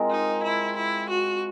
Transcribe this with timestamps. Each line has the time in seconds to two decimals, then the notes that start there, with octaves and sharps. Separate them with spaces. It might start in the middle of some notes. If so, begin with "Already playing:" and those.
Already playing: G#3 C4 F4 A#4
0.11 D#4
0.43 E4
0.77 E4
1.09 F#4